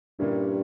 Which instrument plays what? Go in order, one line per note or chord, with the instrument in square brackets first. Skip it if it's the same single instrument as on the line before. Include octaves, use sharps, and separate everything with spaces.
[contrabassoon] G2 [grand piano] A#2 G3 A#3 C#4 E4